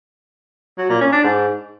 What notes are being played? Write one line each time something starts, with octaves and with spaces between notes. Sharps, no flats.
F#3
A#2
C#4
D4
G#2